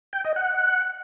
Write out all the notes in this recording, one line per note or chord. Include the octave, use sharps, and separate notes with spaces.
G5
D#5
F#5